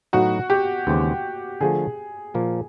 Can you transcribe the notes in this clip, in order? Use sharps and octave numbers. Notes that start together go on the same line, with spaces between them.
A2 F#3 B3 D#4 F#4
G4
D#2 C#3 E3 G#3 C4
D3 F3 A3 G#4
A#2 F3 A#3